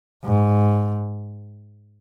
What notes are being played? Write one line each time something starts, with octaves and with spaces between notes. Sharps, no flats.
G#2